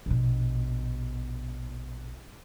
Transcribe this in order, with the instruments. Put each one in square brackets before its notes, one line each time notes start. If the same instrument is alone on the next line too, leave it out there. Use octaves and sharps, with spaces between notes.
[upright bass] A#1 B2